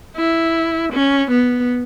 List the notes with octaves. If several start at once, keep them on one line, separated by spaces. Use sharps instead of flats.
E4
C#4
B3